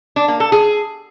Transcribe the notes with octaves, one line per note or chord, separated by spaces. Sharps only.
D4
A#3
A4
G#4